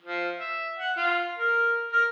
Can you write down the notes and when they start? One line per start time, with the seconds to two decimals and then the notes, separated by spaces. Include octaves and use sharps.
0.03 F3
0.38 E5
0.79 F#5
0.96 F4
1.36 A#4
1.92 A#4